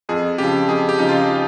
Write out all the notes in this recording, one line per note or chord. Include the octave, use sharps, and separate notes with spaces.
F2 G#4
C#3 F3 G4
F2 G#4
G4
C#3 F3 D#4
F4